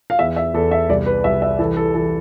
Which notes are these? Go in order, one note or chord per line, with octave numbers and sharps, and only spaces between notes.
F5
E2 E5
E5
E2 A4
E5
C2 D5
B4
C2 E5
E5
E3 A4
A4
E3 A4